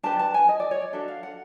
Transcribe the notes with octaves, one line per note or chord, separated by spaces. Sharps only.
D4 G4 B4 A5
A5
G#5
D#5
D5
C#5
D5
D4 F#4 A4 E5
F5
F#5